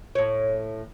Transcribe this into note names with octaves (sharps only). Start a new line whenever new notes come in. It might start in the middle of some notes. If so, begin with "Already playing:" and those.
A2 C#5